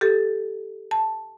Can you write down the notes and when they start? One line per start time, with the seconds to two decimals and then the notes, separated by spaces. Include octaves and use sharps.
0.01 G4 A4
0.91 A5